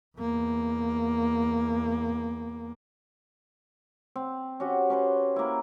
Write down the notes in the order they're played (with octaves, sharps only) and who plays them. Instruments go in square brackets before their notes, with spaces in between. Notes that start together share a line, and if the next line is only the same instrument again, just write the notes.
[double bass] E2 A#3
[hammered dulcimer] C4
C#4 F#4 G4
C#4 B4 C5
A#3 E4